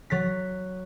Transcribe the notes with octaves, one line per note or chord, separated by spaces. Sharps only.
F#3 A6 B6